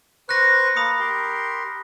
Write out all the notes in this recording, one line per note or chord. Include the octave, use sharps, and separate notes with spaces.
B4 C5 C#6 F#6 A#6
A#3 B5 D#6 C#7
G4 A#4 C6